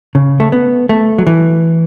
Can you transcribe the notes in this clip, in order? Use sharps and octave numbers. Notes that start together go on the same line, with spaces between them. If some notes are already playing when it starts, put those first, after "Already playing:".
C#3
A3
B3
A3
F#3
E3